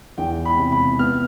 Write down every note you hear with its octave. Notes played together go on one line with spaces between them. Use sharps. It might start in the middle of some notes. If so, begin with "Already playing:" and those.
E2 G5
B5
C3
B5
B3 F6